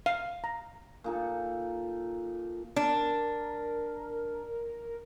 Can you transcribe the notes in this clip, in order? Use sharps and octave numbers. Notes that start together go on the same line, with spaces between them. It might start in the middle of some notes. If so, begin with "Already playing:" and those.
F5
A#5
A#2 D#4 A4
D4 A#4